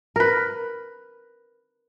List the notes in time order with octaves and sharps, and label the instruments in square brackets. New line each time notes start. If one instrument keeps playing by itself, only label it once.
[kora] A#4 B4